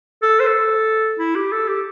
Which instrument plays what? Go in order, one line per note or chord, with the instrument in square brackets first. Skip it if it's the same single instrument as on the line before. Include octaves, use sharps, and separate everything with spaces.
[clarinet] A4
C5
A4
E4
G4
A4
G4